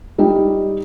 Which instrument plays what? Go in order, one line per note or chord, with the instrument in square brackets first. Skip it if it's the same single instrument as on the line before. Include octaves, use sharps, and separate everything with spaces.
[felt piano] G3 D#4 G4 G5